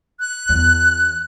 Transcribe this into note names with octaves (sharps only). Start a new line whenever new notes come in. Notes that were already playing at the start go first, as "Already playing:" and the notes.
F#6
E2